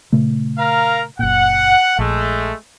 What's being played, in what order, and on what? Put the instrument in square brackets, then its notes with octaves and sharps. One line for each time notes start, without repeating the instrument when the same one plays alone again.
[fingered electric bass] A#2 C#3 A3
[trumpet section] A#4 F5 A#5
[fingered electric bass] F#1 A#2 [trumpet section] F#5
[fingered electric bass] A#1 [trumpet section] G#3 A3